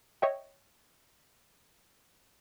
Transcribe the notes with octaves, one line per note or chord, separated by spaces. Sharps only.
C#5 D#5 E5 G5